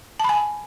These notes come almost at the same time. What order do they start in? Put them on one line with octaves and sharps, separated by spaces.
A5 B5 G#5